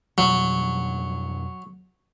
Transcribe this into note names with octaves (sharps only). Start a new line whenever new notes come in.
F2 B2 F#3 G3